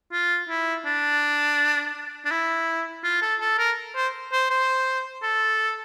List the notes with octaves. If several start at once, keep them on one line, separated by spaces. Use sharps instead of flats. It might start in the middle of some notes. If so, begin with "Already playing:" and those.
F4
E4
D4
D4
E4
F4
A4
A4
A#4
C5
C5
C5
A4